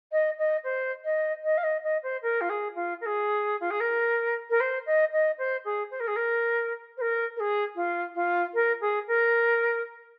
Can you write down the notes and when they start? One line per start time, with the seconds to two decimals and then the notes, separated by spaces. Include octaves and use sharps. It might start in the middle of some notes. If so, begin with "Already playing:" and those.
0.11 D#5
0.38 D#5
0.63 C5
1.04 D#5
1.43 D#5
1.57 F5
1.63 D#5
1.83 D#5
2.03 C5
2.22 A#4
2.40 F4
2.49 G#4
2.75 F4
3.00 A#4
3.05 G#4
3.60 F4
3.70 G#4
3.80 A#4
4.49 A#4
4.60 C5
4.86 D#5
5.12 D#5
5.38 C5
5.64 G#4
5.90 C5
5.99 A#4
6.07 G#4
6.15 A#4
6.97 C5
7.01 A#4
7.36 A#4
7.39 G#4
7.75 F4
8.14 F4
8.53 A#4
8.80 G#4
9.07 A#4